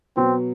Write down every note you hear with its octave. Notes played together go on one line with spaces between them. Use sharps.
B2 F#3 B3 C4